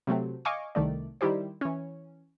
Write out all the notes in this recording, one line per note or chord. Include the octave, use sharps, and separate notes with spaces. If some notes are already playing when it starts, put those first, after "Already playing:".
C3 F#3 A3 C4
D#5 F5 G#5 C#6 D6
C2 D#3 A3 D5
D#3 G3 E4 G4 C5
E3 C#4